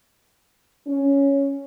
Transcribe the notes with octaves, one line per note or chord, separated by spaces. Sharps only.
C#4